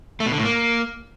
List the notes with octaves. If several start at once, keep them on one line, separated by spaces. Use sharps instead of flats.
A3
B2
D3
A2
A#3